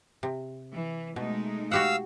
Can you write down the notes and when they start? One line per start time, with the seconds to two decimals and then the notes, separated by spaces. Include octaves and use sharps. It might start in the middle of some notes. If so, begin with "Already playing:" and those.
0.23 C3
0.72 E3
1.16 B2 G#3 A3 D#4
1.71 F#4 G4 F5 F#5 E6